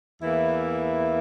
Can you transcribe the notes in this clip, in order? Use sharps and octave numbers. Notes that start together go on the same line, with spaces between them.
E2 E3 A#3 E4